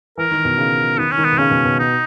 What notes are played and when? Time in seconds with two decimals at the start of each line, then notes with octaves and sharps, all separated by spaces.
0.18 E3 A#4
0.31 D#3
0.45 B2
0.58 C#3
0.98 D#3 B3
1.11 C#4
1.18 D#3
1.24 B3
1.32 B2
1.38 C#3 C#4
1.51 B2
1.65 B2
1.79 D#4